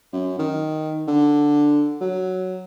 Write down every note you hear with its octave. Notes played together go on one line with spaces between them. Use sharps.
F#2
D#3
D3
F#3